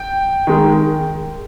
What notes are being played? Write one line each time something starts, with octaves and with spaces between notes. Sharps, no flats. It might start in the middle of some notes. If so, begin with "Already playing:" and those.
Already playing: G5
D#3 G#3